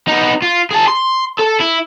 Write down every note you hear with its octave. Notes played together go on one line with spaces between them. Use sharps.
B3 D#4
F4
G#4 A5
C6
A4
E4